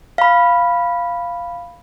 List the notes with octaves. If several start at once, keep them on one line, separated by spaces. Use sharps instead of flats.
F5 B5